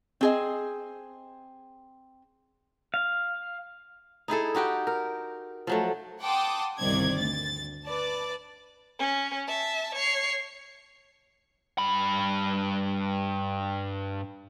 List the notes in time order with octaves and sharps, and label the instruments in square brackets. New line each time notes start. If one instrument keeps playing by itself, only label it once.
[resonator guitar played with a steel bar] C4 G#4 D#5
[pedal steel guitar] F5
[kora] D#4 E4 G#4 A4
D#4 F#4 G4 G5
A#4
F3 F#3 A3
[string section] F#5 G5 A5 C6 D6 D#6
G1 C2 D#3 C5 D5 G#6
D2 A6
B4 D5 A5
[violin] C#4
E5 A5
C#5 C7
[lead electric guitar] G2 B5